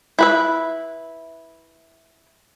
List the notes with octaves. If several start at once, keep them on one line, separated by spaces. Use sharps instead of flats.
E4 B4 E5